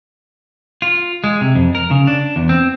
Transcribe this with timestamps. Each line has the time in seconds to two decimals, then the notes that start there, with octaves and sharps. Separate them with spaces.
0.82 F4
1.24 G#3
1.41 C3
1.55 F2
1.75 A#4
1.91 C#3
2.07 D4
2.36 E2
2.49 C4